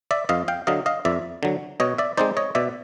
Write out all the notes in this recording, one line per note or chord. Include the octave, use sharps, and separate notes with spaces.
D5 E5
F2 D#5 F5
F5 G5
D3 F#3 D#5 F5
D#5 F5
F2 D5 E5
D3 F#3
B2 C#5 D#5
D5 E5
G#3 C4 D#4 C5 D5
C#5 D#5
B2 D5 E5